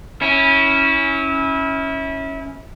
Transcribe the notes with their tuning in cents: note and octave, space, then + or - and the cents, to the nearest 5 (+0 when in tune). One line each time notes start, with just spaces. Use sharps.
C#4 +0 E4 -25